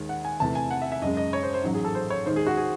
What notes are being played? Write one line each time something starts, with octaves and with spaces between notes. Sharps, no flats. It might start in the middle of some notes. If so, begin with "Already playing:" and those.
Already playing: D#2 D#3 G#3
F#5
G#5
E2 C3 E3 A3 A5
G#5
F#5
E5
E5
F#2 C#3 G#3 D#5
D#5
C#5
C5
C5
A1 G#2 F#3
G#4
A4
C5
C#5
D#2 D#3 G#3 C5
G#4
F#4
G#4